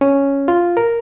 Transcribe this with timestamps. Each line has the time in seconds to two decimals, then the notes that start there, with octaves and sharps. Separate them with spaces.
0.01 C#4
0.48 F4
0.77 A#4